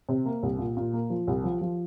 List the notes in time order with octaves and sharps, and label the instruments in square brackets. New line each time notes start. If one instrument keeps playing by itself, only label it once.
[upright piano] C3
A#3
C2
A#2
A#2
A#3
F3
C2
F3
F3